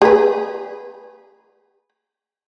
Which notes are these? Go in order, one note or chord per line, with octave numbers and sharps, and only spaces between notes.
G#4 B4